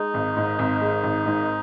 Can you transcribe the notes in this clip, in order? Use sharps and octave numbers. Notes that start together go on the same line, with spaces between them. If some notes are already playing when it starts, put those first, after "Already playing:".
Already playing: G#3 D#4
G#1
G#2
G#1
G#3
G#1
G#2